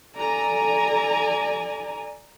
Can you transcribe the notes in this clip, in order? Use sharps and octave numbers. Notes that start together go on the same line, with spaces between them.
A4 D5 G#5 A#5